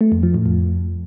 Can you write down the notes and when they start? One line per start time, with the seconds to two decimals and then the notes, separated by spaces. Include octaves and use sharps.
0.01 A3
0.12 F2
0.23 F3
0.34 A2
0.46 F2